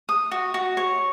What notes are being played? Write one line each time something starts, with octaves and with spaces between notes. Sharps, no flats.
D#6
F#4
F#4
C#5